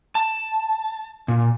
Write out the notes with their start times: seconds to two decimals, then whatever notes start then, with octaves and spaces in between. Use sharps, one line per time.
0.15 A5
1.28 A#2